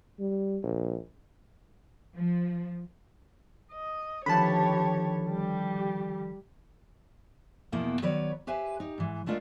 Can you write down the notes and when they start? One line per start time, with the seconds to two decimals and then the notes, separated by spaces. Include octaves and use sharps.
0.19 G3
0.63 A#1
2.15 F3
3.73 D#5
4.26 D3 D#3 F3 G4 C#5 A5 B5
5.28 G3 G4
7.72 E2 B2 F3 A#3 B3 E4
8.02 D#3 F#3 B4 C#5 D5
8.47 G4 B4 C5 E5 G#5
8.80 D#4 G4
8.98 G#2 E3
9.26 G#3 A3 D4 F4 A#4 D#5